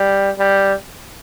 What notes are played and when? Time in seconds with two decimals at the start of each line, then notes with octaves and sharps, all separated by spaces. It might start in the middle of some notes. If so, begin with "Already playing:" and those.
Already playing: G3
0.39 G3